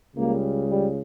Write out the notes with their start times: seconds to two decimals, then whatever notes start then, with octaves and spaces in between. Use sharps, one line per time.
0.14 C#2 C#3 G3 A#3
0.69 G3